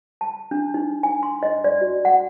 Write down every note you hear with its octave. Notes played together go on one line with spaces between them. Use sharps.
A5
D4
D#4
G#5
C6
D#5
D5
F#4
F#5